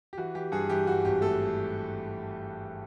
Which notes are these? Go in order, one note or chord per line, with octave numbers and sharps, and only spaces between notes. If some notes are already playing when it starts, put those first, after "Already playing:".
G4
E3 F#4
E3 G4
G2 G#4
E3 G4
G2 F#4
G#1 G4
A3 A4